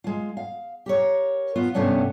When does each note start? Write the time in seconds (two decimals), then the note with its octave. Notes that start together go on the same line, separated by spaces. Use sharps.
0.04 G#3 F4
0.37 F5
0.86 G4 A#4 C#5
1.56 B3 F4
1.74 G2 C3 A3 B3 C#4 D4